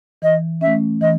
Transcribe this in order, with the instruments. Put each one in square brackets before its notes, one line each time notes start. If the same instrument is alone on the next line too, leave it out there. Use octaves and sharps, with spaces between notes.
[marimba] E3 [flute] D#5
[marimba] C#4 [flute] E5
[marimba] A3
[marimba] E3 [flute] D#5